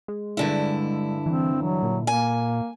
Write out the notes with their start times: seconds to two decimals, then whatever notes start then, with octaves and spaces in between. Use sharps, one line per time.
0.08 G#3
0.37 G2 D3 E4
1.26 E3 C4
1.62 E3 F#3
1.83 A#2
2.07 A#3 G#5